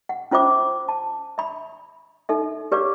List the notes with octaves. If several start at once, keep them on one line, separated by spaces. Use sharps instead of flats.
F#5
C#4 F4 C5 E5 D6
A5
E5 B5
D#4 A4 E5
G4 B4 C#5 D5 F5 D6